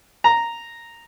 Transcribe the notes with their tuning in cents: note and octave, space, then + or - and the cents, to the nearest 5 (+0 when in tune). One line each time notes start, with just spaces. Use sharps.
A#5 -5